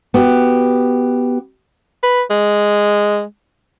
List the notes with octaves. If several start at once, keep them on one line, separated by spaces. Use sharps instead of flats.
B3 F#4 G4
B4
G#3